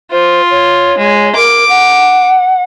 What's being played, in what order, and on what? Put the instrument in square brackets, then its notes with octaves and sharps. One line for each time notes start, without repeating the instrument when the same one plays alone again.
[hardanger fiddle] F4 [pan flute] C5
[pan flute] C#5
[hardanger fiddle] G#3
[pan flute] A#4 [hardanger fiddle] D6
[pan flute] F#5